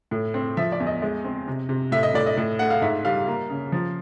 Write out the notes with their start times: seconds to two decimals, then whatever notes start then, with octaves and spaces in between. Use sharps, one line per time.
0.11 A2
0.34 C4
0.57 F3 E5
0.72 D5
0.80 E2
0.87 D#5
1.02 G#3
1.24 C4
1.48 C3
1.69 C3
1.92 A2 E5
2.03 D#5
2.14 A2 D5
2.26 D#5
2.37 A2
2.59 A3 F#5
2.70 F5
2.82 G#2 E5
3.05 G3 F5
3.27 A#3
3.50 C#3
3.72 F3